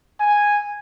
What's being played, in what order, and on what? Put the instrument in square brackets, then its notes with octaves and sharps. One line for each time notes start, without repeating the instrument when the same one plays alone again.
[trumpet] G#5